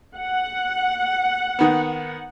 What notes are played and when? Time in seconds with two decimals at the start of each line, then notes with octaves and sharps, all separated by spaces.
0.17 F#5
1.59 D#3 B3